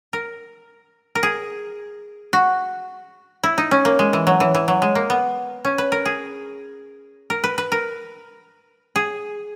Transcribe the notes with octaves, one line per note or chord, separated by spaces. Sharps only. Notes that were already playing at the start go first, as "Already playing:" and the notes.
A#4
A#4
G#4
F#4
E4
D#4
C#4
A#3
G#3
E3
F#3
E3
E3
F#3
G#3
A#3
B3
C#4
B4
A#4
G#4
A#4
B4
B4
A#4
G#4